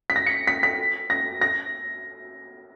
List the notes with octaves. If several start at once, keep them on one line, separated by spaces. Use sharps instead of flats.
B6
A#6
C#7
B6
B6
A#6
A#6